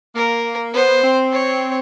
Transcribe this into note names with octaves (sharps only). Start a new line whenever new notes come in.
A#3 A#4
B3 C5
C4
C#5